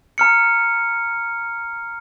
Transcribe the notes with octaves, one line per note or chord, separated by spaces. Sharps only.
A#5 F6 C#7